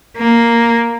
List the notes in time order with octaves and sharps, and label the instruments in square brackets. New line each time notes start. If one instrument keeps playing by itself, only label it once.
[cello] A#3